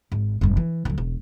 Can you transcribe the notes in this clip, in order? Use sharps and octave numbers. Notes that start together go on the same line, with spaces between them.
G#1
F1 G2
E3
D2 F#3
E1